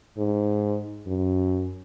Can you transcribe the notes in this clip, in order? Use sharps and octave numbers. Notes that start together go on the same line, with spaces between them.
G#2
F#2